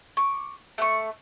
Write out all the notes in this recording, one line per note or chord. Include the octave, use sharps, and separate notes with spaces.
C#6 D6
A3 F#5 C#6